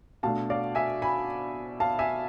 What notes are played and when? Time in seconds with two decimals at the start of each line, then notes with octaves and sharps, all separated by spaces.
0.23 B2 A3 D4 F5 A5
0.50 D5 F5
0.75 E5 G#5
1.02 G#5 B5
1.80 F5 A5
1.99 E5 G#5